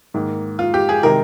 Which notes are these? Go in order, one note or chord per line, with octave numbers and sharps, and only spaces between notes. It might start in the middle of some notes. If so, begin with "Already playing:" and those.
G#2 D#3 A#3
F4
G4
G#4
C3 D#3 G#3 C4 A#4